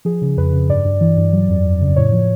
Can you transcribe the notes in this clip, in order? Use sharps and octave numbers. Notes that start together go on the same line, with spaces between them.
F3 G#4
C#3
F2 B4
C#3
G2 D5
G2
E3
G2
F#3
F2
F2
C#3
A2 C#5
F3